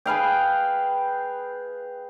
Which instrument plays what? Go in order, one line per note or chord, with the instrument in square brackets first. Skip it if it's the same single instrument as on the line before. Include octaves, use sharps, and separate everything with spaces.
[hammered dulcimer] G#4 B4 F5 G5